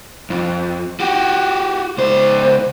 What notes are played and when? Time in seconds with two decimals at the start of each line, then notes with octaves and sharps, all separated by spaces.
0.30 F2
1.00 F#4 G4
1.98 C#2 C5